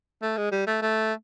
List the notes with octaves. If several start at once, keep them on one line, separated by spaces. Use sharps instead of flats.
A3
G#3
G3
A3
A3